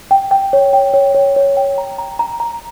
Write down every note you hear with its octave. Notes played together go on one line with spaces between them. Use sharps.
G5
G5
C#5
G5
C#5
C#5
C#5
G5
A#5
A#5
A#5
A#5